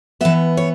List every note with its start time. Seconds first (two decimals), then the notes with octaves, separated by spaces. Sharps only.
0.21 E3 B3 E5
0.57 C#5